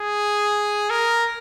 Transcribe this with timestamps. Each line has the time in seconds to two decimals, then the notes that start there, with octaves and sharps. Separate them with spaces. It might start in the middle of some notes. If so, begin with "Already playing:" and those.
Already playing: G#4
0.90 A#4